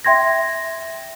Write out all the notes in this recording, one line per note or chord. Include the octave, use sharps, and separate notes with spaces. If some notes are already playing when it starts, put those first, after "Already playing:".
E5 G5 C6 G#6 A#6